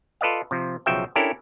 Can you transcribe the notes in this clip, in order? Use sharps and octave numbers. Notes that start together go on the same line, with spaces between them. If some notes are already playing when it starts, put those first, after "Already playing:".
F4 A4 B4 D5 D#5 F5
C3 F3
B1 C#3 F3 F#4 E5 G5
C#4 D4 E4 G4 A4 A#4